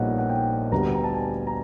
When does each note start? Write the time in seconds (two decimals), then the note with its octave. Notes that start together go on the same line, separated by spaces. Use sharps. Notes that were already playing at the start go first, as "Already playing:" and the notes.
Already playing: A#1 A#2 G3 B3 D#4 C#5 D#5 F#5
0.18 F#5
0.29 G5
0.71 D2 D3 G3 B3 A#5
0.94 A#5
1.04 A5
1.14 G#5
1.47 A#5